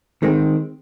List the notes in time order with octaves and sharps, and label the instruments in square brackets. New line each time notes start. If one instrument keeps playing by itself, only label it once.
[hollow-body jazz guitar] D#3 G#3 C4